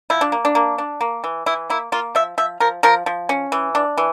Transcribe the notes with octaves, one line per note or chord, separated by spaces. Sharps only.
F3 E4
D4
A#3
D4
A#3
D4
A#3
E3
E3 E4
A#3 E4
A#3 F4
F3 E5
F3 E5
F3 A#4
F3 A#4
F3
C#4
E3
D4
E3